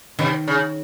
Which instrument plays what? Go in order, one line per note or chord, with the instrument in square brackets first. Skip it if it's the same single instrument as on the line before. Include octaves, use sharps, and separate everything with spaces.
[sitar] C3 [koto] D#3
[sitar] C#3